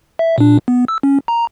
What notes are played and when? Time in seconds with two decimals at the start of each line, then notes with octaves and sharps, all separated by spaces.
0.19 E5
0.38 A#2 D4
0.68 B3
0.88 E6
1.03 C#4
1.28 A#5